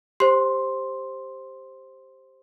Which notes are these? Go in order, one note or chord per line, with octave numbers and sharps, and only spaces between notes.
G4 C5 C6